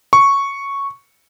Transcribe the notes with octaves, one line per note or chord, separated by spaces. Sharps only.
C#6